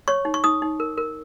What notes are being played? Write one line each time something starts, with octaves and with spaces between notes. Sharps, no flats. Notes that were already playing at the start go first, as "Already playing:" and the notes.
C#5 C#6
D#4
C#6
D#4 D#6
D#4
A#4
A#4